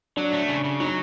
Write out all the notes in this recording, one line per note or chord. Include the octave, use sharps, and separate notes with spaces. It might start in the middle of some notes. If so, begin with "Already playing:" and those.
F#3 D4
A3
C#3
C#3
F#3 D#4